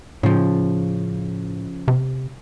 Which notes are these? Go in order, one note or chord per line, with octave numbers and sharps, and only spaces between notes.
A2 C#3 F3
C3